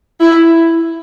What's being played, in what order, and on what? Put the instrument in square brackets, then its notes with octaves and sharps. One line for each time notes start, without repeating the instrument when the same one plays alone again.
[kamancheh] E4